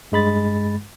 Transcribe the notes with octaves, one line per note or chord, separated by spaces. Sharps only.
G2 G#3 B5 A6